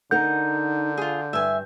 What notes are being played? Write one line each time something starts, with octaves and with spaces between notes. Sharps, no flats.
D3 D#4 A#4 F#5 G6
F4 G#4
G2 E5 G#5